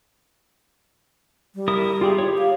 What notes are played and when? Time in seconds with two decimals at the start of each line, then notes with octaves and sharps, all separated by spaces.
1.55 G3
1.68 E4 A#4 D#6
2.01 F4 G4 G#4
2.18 G4 C#5
2.38 F5